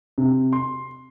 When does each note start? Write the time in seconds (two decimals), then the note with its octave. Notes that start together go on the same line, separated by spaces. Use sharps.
0.18 C3
0.53 C6